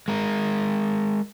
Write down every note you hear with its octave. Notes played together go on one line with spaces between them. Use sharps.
G#3 A#4